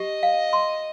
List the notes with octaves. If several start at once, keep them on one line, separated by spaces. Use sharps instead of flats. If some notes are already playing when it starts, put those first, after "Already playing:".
Already playing: G4 D#5
F5
C6